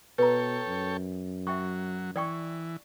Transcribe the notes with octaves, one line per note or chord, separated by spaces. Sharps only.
B2 A4 B4 C#5 G5 A#5
F#2
F#3 E5 G5 C#6
E3 D5 G5 C#6